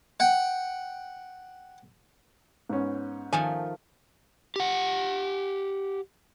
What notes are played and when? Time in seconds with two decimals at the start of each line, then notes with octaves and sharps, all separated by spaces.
0.20 F#5 G5
2.69 G#2 B3 C#4
3.33 D#3 F3 A3 G#5
4.56 G4 F#5